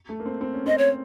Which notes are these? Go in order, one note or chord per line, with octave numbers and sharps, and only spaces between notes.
A3
A#3
C4
C4
C#4
C4 D#5
C#5